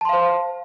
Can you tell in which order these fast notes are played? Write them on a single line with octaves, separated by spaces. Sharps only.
A5 C6 F5 C5